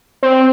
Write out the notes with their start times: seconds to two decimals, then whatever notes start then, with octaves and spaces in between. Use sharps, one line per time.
0.23 C4